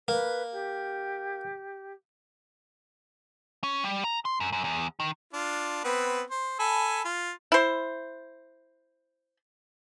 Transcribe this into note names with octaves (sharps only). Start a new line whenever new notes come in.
A#3 B4
G4
C#4
G3
A#5
C6
F#2
F#2
E2
D#3
D4 F4
B3 C4 B4
C5
A4 G#5 B5
F4
E4 C5